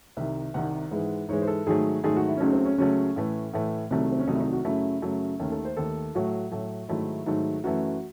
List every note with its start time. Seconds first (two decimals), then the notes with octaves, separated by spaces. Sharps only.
0.17 C2 C3 D#3 E5
0.54 C2 C3 D#3 F#5
0.91 G#2 E3 G#3
1.29 G#2 E3 G#3 C#5
1.42 C5
1.47 A4
1.67 G#2 D#3 F#3 A3 G#4
2.03 G#2 D#3 F#3 A3 G#4
2.16 F#4
2.28 E4
2.37 C#4
2.40 C#2 C#3 F#3 A3 D#4
2.53 C4
2.66 C#4
2.78 C#2 C#3 F#3 A3 C#4
3.16 A2 E3 A3
3.53 A2 E3 A3
3.91 C2 C3 D#3 F#3 A3
4.12 C4
4.20 C#4
4.27 C2 C3 D#3 F#3 A3 D#4
4.35 E4
4.40 D#4
4.53 F#4
4.65 F#2 C#3 F#3 A3 E4
5.02 F#2 C#3 F#3 A3
5.40 D#2 D#3 A3 C#4
5.52 A4
5.65 C5
5.77 D#2 D#3 A3 A4
6.15 A2 F#3 A3 F#4
6.51 A2 F#3 A3
6.89 G#2 D#3 F#3 A3 E4
7.26 G#2 D#3 F#3 A3
7.64 F#2 E3 A3 F#4